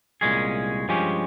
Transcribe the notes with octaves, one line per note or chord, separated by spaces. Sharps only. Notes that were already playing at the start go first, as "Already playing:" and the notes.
C2 A#2 G#3 C#4 G#4
G2 F3 G#3 C#4 G4